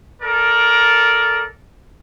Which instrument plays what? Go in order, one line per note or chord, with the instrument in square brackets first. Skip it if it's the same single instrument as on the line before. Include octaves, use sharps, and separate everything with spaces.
[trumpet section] A4 A#4 D5